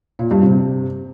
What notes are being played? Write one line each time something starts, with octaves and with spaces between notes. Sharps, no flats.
A#2
G2
C3